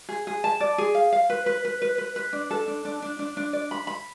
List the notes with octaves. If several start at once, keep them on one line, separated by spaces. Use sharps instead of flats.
G#4
G#4
A5
D5
G#4
F5
F5
B4
B4
B4
B4
B4
B4
D4
A4
D4
D4
D4
D4
D4
D5
B5
B5